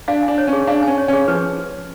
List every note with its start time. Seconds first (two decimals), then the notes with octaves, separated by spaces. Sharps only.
0.08 D4 F5
0.23 G#5
0.28 D4
0.38 C#5
0.47 C#4
0.53 G#4
0.67 D4 F5
0.83 C#4 G#5
0.98 C#5
1.08 C#4 G#4
1.28 F3 B4